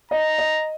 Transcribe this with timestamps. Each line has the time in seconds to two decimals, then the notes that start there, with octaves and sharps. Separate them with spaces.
0.11 D#5 A#5
0.38 D#5